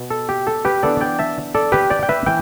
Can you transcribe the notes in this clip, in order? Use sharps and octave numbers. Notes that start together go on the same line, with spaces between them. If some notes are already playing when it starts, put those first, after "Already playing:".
Already playing: B2
A4
G4
A4
G4 B4
E3 B3 D4 A4 D5
D5 G5
E5 A5
A4 D5
G4 B4
D5 G5
G5
B4 E5
E3 G5